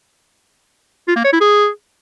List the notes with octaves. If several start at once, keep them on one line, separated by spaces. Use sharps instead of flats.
F4
A#3
C#5
E4
G#4